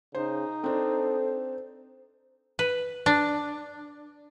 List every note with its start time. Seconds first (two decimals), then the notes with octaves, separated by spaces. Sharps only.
0.15 C#3 D#4 C5
0.64 C4 D4 A4 C5
2.59 B4
3.06 D4